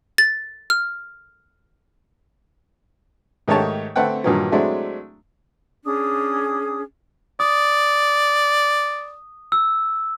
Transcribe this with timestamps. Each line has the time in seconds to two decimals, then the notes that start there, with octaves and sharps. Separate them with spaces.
0.18 A6
0.70 F6
3.48 G#2 D#3 A3 G4 C#5 A5
3.96 D3 A3 C4 B4 F#5 G5
4.24 G2 A#2 D#3 E3 F#3
4.52 F#3 G#3 A3 C4 D4 E4
5.84 C#4 D4 G#4 D#6
7.40 D5 D#6
9.52 E6